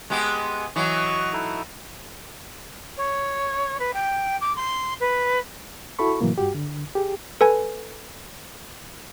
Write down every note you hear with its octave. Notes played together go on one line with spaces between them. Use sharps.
G#3 B3 G4
E3 F#3 D#5 C#6
D#4 E4 A4
C#5
B4
G5
D6
C6
B4
E4 F#4 A4 B5 C#6
A2 C3 E3 F#3 A#3
G2 F#4 G4
D3
G4 G#4
A4 B4 G#5